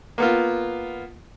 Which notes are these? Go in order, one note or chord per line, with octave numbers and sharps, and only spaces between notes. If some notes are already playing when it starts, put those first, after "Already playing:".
A#3 B3 F4